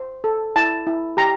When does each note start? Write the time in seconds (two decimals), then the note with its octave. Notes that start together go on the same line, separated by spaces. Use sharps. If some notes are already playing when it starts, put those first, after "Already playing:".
Already playing: C5
0.24 A4
0.56 E4 A5
0.87 E4
1.17 G4 A#5